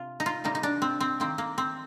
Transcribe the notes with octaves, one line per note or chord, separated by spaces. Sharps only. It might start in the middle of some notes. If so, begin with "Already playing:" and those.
Already playing: C3 F4
D#4
F4
C3 G3 A#3 D#4
D#4
D4
C4
C4
D#3 A#3 C4
A#3
C4